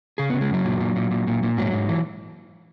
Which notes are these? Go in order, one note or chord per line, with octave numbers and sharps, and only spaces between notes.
C#3 G#4
C#3 B3
G#3
F#2 F#3
A#2
A#2
A#2
A#2
A#2
A#2
G#2 F#3
G#2
E3